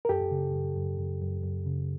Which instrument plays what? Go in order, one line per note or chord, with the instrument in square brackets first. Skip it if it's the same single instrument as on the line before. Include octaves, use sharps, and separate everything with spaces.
[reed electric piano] A#4
F#2 G4 A4
C#3
F#2
F#2
F#2
F#2
F#2
C#3